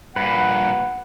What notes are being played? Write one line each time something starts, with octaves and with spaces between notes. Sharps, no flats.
G2 A#2 B4 F#5